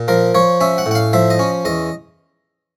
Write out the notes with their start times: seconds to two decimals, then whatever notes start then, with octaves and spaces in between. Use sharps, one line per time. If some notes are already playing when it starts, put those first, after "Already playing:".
Already playing: A#2
0.08 F3 A#4
0.35 F3 C#5
0.61 C#4 E5
0.78 F#5
0.86 A2
0.91 F#5
0.95 F5
1.13 F3 E5
1.30 D#5
1.39 C#4
1.65 E2 D#5